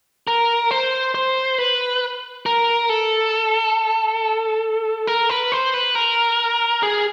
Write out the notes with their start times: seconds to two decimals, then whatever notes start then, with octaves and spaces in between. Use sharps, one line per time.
0.27 A#4
0.71 C5
1.15 C5
1.58 B4
2.46 A#4
2.89 A4
5.07 A#4
5.29 B4
5.52 C5
5.74 B4
5.95 A#4
6.83 G#4